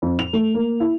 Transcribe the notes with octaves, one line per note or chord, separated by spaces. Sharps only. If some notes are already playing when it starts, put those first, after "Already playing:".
F2
F7
A3
A#3
E4